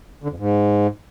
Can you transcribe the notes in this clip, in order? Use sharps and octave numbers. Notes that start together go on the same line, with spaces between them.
D3
F2
G#2